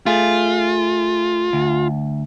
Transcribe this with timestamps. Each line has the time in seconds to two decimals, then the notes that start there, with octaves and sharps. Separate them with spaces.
0.06 A3 F4 G#4
1.53 D2